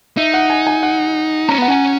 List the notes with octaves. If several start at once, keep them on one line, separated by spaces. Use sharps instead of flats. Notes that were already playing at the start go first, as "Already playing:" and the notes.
D#4 E5
F#5
G#5
G#5
F#5
C#4 A#5
B3 F#5
C#4 G#5